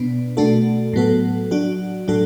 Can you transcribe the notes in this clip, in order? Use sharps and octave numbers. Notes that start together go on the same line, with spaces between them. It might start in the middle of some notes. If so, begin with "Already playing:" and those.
Already playing: B2 B3 D4
B2 A3 D4 F#4 A4
A2 F#3 B3 F#4 A4
F#3 D4 F#4
A2 F#3 D4 F#4 A4